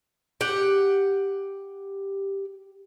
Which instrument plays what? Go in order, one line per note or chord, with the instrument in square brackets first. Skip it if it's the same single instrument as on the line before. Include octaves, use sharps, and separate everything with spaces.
[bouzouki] G4 F#5